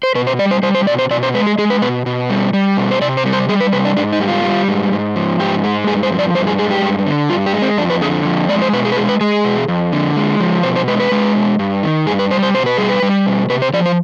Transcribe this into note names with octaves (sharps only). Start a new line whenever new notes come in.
C5
B2 B4
C5
G3 D5
C5
G3 C5
C5
B2 D5
C5
B2 D5
C5
G#3 B4
G#4
G#3 G#4
B4
B2 B4
B2
G3
G3
B2
C5
C3 D5
C5
G3
C5
G3 G#4
B4
C3 B4
D4
G#2 D4
D#4
G3
F4
G3
G#2
G#2
F3
G#2 G4
G#3
G2 G#4
C5
F3
D5
G2 C5
G#4
G#3 G#4
G4
G2
D3
G2 F4
G4
G#3
C4
F2 D4
B4
D3 G#4
F2
G#3 D5
C5
B2 B4
G#4
B4
G#3 G#4
B4
G#3 G#4
B2
F2
D3
G#3
F3
B2 C5
C5
G#3 B4
B4
G#3
B2
G2
D#3
G2 G#4
B4
G3 C5
C5
B2 C5
B4
G3 G#4
B4
G3
B2
C3 B4
C5
F3 D5
C5